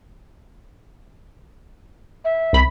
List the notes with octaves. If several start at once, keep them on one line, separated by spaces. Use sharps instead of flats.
E5
C2 B5